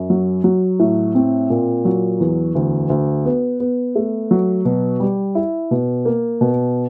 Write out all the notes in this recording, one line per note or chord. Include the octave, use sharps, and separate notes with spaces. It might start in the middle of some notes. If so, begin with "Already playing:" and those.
Already playing: F#2
F#3
F#3
A2
C4
A#2
F#3
E2
D2
D2
B3
B3
A3
F#3
B2
G3
E4
B2
A#3
B2